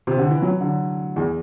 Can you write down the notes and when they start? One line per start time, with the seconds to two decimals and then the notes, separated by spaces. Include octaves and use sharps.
0.07 C3
0.18 D3
0.30 E3
0.42 F#3
0.61 D3
1.16 E2